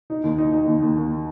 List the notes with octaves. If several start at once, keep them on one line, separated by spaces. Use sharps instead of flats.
D#4
D#2
D#4
D#4
D#2
D#2
D#2